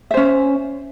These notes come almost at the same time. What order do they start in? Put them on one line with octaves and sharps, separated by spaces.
E5 C5 C#4